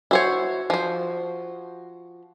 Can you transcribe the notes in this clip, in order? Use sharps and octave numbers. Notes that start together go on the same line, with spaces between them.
E4 F#4 C5 C#5
F3 C5